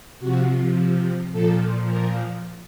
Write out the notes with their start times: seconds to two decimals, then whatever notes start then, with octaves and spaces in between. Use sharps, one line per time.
0.20 C3 F3 F#4
1.32 A#2 F3 A4
1.88 A#4